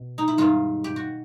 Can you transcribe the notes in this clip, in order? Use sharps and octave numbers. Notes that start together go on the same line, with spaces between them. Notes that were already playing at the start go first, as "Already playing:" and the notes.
Already playing: B2
D#4
E4
G2 D#3 G#3 F4
G4
F#4